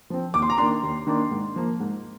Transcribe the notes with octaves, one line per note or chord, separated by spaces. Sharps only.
F3 C4
D#2 D6
C6
A#5
D#3 A#3 D4 C6
D#2
D#3 A#3 D4
G#2
F3 A#3
G#2